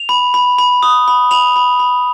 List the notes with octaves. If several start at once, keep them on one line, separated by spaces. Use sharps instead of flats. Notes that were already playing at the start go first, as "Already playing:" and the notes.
Already playing: F7
B5
B5
B5
D#6
B5
B5 F7
B5
B5